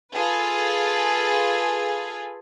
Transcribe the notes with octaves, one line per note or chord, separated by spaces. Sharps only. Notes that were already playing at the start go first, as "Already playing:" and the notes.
F4 G#4 A4 B4